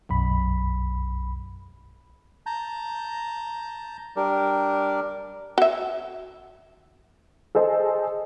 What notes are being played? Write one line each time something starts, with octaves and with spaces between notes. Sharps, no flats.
B1 F#2 B5
A5 A#5 G6
G3 D4 G4 A#4
F#4 E5
G#4 A4 C5 D#5